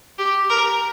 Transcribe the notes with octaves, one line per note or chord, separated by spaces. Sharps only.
G4
A#4